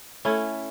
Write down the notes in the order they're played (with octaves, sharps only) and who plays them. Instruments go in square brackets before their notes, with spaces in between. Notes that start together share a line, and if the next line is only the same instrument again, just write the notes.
[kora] A3 C#4 E4 A4